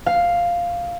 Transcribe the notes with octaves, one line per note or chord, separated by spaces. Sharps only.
F5